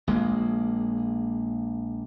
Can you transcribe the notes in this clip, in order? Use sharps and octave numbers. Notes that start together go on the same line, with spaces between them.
A#1 G#3 A#3